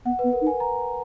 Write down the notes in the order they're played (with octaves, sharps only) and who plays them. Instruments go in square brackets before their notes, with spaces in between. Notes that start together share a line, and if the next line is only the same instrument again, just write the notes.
[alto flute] B3 [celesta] F#5
[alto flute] B3 [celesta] B4
[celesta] A#4
[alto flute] D#4
[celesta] G#5
A#5